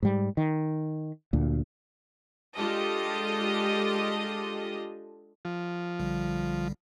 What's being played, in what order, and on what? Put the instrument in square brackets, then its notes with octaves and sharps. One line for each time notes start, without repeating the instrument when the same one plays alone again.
[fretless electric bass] G#2 G3
D#3
D2 A#2
[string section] G#3 D4 F4 G4 A4 D#5
[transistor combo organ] F3
[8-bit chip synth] B1 D3 G3